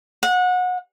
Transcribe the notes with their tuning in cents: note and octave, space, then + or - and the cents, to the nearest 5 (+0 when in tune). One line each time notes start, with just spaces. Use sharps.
F#5 -25